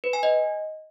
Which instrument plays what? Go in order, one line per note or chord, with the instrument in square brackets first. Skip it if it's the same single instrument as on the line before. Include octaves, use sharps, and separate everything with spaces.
[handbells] B4
G#5
D#5